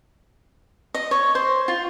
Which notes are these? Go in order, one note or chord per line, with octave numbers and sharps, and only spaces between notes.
D#5
C#5
C5
F4